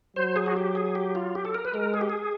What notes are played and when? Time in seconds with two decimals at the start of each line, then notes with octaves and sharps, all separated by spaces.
0.16 F#3 C5
0.36 G#4
0.46 F#4
0.57 G4
0.75 G#4
0.95 G4
1.15 F4
1.35 G4
1.45 A4
1.54 A#4
1.65 B4
1.74 G#3 A#4
1.94 G#4
2.01 G4
2.10 G#4